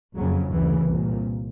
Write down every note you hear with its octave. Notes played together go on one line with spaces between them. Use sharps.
F#1 F2 C#3 F#3
D2 C#3 E3
C2 A#2